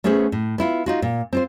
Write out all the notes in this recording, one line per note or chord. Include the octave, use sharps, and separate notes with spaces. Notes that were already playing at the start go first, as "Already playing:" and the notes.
A3 B3 C#4 G#4 C5 F#5
A2
B3 E4 F4
D#4 F4 F#4
A#2
C4 F4 C5